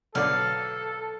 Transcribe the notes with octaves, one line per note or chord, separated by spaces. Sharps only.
B1 D3 A4 D5 F5